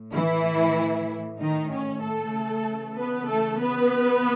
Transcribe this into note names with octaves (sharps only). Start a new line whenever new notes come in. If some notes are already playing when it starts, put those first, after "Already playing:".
Already playing: A2
E3 E4
D#3 D#4
C#4
A3 A4
C#3 E3
B3 B4
A3 A4
B3 B4